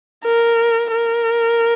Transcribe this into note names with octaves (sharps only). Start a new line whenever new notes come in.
A#4
A#4